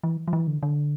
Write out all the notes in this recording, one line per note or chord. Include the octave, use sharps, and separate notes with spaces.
E3
F3
E3
D3
D3